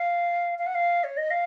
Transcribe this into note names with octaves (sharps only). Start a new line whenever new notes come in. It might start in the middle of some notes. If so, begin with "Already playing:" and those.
Already playing: F5
F5
F#5
F5
C#5
D#5
F5